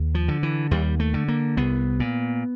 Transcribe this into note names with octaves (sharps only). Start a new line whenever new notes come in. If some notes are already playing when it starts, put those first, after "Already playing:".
Already playing: D#2
F3
D3
E3
D#2 G3
A3
D3
A#3
C2 B3
A#2